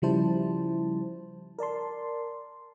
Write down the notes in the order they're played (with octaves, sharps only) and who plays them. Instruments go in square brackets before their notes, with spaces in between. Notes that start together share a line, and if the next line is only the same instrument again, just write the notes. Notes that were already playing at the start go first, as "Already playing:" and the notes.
[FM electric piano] C#3 F3 G3 E4 C5 A5
A#4 D5 A5 C6